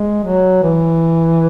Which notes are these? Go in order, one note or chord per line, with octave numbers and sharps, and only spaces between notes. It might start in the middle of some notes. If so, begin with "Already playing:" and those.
Already playing: G#3
F#3
E3